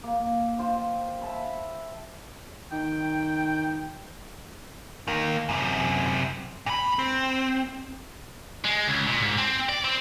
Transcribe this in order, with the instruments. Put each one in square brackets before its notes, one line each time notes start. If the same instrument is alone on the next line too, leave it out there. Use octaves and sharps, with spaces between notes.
[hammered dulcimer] A#3
F4 C5 G5
E5 A5 B5
[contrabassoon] D#3 [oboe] G5
[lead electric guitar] D#3 A#3
F#2 C3
A#2 B5
C4
[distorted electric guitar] G#3
C#2
A#2
G#2
C4
D5
C4